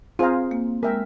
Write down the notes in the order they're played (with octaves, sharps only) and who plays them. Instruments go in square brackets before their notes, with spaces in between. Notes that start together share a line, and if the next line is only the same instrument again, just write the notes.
[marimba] C4 [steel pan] F4 G#4 C5 F5 A#5
[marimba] A#3
[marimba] G#3 [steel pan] A#4 E5 G5 A#5